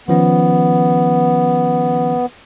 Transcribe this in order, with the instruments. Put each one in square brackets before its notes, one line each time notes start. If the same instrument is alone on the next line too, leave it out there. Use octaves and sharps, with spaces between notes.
[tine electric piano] D#3 F3 C#4 [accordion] B3